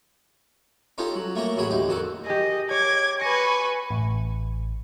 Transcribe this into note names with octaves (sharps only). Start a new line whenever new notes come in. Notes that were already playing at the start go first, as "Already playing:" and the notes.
C#4 D#4 F4 G4 A4
F#3
A3 A#3 C#4 A#4
A1 F#3 G#4 C#5 G5 B5
D2 D#4 G4
F2 D#3 F#4 A4
G4 G#4 D#5
C#5 D6 G#6
B4 G#5 C#6 A#6
A1